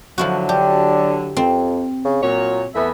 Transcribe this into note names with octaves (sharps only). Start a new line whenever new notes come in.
D3 F3 F#3 E4 F#4
D4 G4
F2 C4
C#3
A#2 F#3 C#5
E2 A3 B3 E5